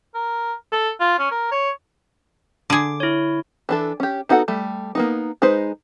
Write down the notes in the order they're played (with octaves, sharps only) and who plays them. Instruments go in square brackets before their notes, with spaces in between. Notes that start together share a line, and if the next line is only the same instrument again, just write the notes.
[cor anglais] A#4
A4
F4
C#4
A#4
C#5
[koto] D3 G#4 [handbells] D6
[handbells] E4 C#5
[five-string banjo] E3 D4 A4
C#4 G4
B3 D#4 F#4 A4 F#5
G3 A3
A#3 B3 D#4
G#3 D#4 B4 C5